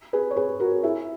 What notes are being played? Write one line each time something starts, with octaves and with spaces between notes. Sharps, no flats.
G#4 B4
C#5
G#4 B4
F#4 A#4
E4 G#4